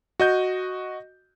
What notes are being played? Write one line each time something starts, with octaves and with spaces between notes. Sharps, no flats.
F#4 D#5 G6